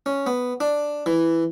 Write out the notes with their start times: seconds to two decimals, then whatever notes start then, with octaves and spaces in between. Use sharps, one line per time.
0.06 C#4
0.26 B3
0.60 D4
1.06 E3